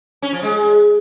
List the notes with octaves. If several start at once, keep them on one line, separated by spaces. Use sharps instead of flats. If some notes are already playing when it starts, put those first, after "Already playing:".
C#4
F3
G#3